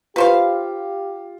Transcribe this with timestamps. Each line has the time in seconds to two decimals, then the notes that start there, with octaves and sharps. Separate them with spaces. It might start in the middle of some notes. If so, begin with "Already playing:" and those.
0.16 F4 G4 B4 C5 F5